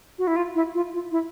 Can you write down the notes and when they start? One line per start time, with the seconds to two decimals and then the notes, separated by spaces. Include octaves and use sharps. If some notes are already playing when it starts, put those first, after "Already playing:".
0.18 F#4
0.27 E4
0.36 F4
0.55 E4
0.75 F4
0.93 F4
1.11 E4